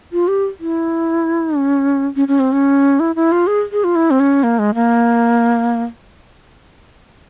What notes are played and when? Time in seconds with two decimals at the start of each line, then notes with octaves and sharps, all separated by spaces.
0.13 F4
0.28 G4
0.60 E4
1.56 C#4
2.16 C#4
2.28 C#4
2.40 C4
2.52 C#4
3.00 E4
3.16 E4
3.32 F4
3.47 G#4
3.72 G#4
3.84 F4
3.95 E4
4.11 C4
4.20 C#4
4.43 A#3
4.59 G#3
4.75 A#3